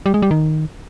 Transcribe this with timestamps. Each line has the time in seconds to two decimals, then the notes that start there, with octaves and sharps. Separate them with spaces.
0.06 G3
0.14 G#3
0.22 G3
0.31 D#3